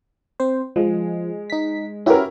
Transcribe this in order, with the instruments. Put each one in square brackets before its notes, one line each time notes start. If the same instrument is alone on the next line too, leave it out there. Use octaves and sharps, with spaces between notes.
[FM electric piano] C4 C5
[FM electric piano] F3 [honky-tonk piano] G#3
[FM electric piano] D#4 B6
[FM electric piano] C#4 F#4 G4 [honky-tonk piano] E4 A#4